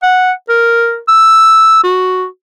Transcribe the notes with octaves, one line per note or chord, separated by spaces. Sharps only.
F#5
A#4
E6
F#4